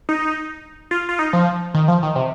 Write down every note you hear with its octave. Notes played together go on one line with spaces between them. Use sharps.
D#4
F4
F4
D#4
F3
D#3
F3
D#3
C3